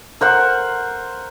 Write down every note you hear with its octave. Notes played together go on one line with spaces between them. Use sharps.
A#4 C5 F#5